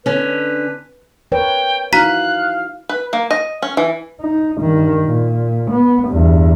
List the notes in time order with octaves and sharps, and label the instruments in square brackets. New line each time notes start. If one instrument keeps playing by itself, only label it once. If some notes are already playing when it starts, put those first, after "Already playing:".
[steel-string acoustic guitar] D3 C#4 [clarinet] B4
[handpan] A#4 B4 C#5 [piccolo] G5
[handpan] D#4 E4 F#4 [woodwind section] F5 [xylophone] A#5 B6 [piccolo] F#6
[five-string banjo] B4
A#3
D#5
C#4
E3
[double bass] D#4
G2 D#3
A#2
B3
E2 G2